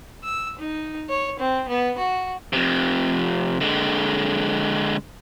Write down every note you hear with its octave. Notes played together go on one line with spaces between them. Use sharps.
E6
D#4
C#5
C4
B3
F#4
F2 C3
D3 G#3